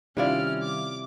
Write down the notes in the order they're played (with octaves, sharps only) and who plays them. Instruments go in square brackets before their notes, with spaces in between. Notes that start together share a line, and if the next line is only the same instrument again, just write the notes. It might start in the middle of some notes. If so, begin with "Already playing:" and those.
[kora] C3 E4 D5 [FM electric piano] D#3 G3 F4 [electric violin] C#4 F6
[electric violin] D6